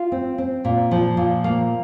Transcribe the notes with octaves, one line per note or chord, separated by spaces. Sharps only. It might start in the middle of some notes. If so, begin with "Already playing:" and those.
Already playing: F4
C4
C4
A#2
F3
A#2
A#3